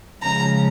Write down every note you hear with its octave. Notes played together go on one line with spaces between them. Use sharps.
C#3 F3 G#3 A#5